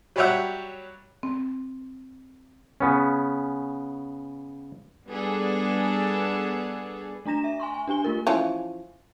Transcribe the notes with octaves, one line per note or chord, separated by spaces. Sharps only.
F#3 G3 G4 C#5 E5 F#5
C4
C#3 B3 C#4
G3 B3 D4 G#4 A4
A3 D4 A#5 A#6 E7
E5
G#5 C6 C#6
G#5
D4 G4 G#5 G7
A3 F4 A#4
E3 F3 C#4